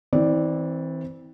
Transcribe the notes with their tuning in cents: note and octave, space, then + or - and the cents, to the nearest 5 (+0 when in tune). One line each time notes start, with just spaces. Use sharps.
E3 -30 C4 +0 D5 +0